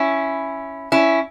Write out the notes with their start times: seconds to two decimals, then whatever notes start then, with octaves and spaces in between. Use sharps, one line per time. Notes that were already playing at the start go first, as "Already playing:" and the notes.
Already playing: C#4 E4
0.92 C#4 E4